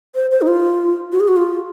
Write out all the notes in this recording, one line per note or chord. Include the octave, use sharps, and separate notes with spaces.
C5
C5
D#4
F4
F#4
G#4
F#4
F4